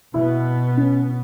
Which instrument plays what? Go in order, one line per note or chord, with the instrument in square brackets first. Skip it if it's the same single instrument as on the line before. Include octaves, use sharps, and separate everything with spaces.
[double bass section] B2 B3 [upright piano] E4
[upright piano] C#4